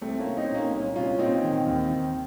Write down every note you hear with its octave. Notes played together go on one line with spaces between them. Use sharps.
C2 A3 C4
A#3 C#4
C2
C4 D#4
A#2
A#3 C#4
C2
C2 C#4 F4
A#2 C4 D#4
D#3
D#2
D#3